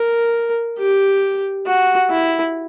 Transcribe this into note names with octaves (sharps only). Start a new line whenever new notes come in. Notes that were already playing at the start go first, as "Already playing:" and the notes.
Already playing: A#4
G4
F#4
E4